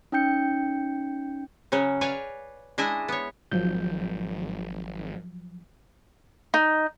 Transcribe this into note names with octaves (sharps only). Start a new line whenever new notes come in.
C#4 D#4 G5 G6 C#7
C#3 F#3 C#4
B4 C#5 D5 F5 G#5
G#3 D4 E4 D#5 G#5
B3 C#5
G#1 F3 F#3 G6
D#4